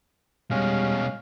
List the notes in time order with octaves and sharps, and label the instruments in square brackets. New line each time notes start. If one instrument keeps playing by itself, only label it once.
[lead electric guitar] B2 G#3 [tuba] G3 [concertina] C#4 F5